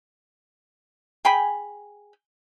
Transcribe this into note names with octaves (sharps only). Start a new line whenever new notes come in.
G#4 G5 G#5 B5